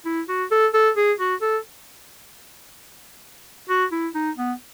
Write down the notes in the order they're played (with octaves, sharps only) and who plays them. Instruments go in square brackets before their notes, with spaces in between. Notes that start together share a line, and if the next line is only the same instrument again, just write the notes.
[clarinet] E4
F#4
A4
A4
G#4
F#4
A4
F#4
E4
D#4
B3